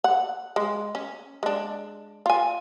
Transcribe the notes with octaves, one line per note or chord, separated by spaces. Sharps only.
F#5
G#3
C#4
G#3 D4
F4 G#5